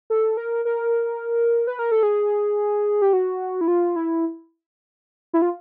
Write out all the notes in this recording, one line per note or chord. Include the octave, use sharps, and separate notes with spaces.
A4
A#4
A#4
B4
A#4
A4
G#4
G4
F#4
E4
F4
E4
E4
F4